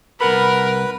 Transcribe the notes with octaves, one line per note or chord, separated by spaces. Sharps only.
C2 A#4 B4 F#5 B5